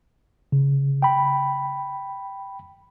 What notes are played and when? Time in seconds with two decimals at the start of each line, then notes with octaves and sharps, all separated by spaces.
0.52 C#3
1.02 G5 B5